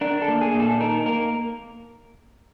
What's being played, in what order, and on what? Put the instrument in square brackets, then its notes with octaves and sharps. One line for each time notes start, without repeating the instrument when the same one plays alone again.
[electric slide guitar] D4 A#4
A4
A#3
G#4
A#2
A4
D#4 A#4
A#3 A#4